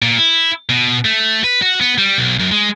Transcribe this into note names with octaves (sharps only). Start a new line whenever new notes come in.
A#2
E4
B2
A3
B4
F#4
B3
G3
B1
F#2
G#3